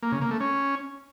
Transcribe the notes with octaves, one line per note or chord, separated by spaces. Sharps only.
A#3
C#3
A#3
A3
C#4